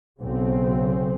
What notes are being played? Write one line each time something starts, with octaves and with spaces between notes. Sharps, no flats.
B1 C#3 C4